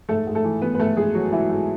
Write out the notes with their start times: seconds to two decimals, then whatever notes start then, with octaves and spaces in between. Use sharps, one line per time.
0.09 G#2 A3 A4
0.27 G#2
0.35 A3 A4
0.44 E3
0.62 E3 B3 B4
0.74 B4
0.79 G#2 A3 A4
0.97 G#2 G#3 G#4
1.14 E3 F#3 F#4
1.32 E3 E4
1.50 G#2 A3